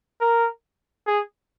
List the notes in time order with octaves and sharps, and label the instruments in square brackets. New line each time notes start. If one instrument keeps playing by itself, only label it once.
[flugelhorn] A#4
G#4